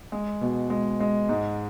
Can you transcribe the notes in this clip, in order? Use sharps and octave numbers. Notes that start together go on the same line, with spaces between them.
G#3
B2
G#3
G#3
G#2